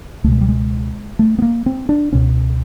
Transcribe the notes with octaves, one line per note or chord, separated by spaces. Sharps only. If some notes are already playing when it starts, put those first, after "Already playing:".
C#2 B2 G#3 A3
G3
G#3
A3
B3
A#3
C4
D4
C#2 B2 C#4